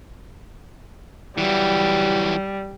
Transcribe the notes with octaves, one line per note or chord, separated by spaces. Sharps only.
E3 F#3 G3